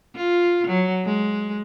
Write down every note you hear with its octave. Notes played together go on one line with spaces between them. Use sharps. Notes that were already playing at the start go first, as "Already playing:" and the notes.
F4
F#3
G#3